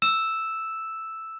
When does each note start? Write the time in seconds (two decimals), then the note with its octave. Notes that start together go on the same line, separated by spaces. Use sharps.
0.02 E6 E7